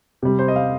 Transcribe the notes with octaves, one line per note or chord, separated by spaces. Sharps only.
C3 G3
C5
D#5
F5